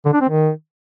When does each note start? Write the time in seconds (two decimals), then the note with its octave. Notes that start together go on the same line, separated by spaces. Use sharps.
0.05 D3
0.13 D4
0.21 C4
0.29 D#3